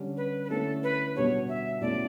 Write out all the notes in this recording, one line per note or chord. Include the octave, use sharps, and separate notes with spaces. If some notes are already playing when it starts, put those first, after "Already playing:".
Already playing: D3 G3 C#4
B4
B4
D3 A3 C#4 E4 A4
B4
B2 G3 B3 D4 C#5
E5
B2 A3 C#4 E4 D5